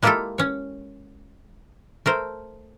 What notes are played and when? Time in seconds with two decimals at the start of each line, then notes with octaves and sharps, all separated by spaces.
0.03 G#3 A#3 E4 F4 G4 A4
0.38 C#4 C#5
2.06 A3 A#4 C5